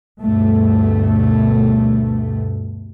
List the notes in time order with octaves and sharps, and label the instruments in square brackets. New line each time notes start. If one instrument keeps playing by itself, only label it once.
[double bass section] D2 G2 B2 A3